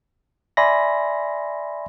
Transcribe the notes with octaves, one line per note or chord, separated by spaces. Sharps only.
D5 E5 G#5 B5 C6 A#6